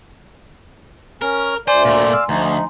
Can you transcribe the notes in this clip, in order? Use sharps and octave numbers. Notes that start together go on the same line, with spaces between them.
C#4 A#4
D2 C5 D5 G#5 C6
A#2 A3
F5 E6
D2 F3 D#4